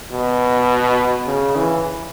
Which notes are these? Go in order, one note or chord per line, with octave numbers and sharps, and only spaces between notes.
B2
C#3
E3